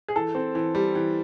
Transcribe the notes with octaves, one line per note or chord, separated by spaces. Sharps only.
G#4
E3 A4
C4
E3
G3
E3